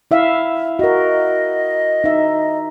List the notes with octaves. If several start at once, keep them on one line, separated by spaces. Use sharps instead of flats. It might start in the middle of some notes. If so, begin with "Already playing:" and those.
E4 E5 F5
F#4 A#4 D#5
D#4 E5